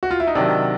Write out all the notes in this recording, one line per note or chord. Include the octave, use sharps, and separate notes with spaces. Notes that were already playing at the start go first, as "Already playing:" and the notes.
F#4
F4
E4
D#4
C3 D#3 F#3 D4